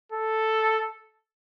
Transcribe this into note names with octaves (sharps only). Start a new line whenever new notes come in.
A4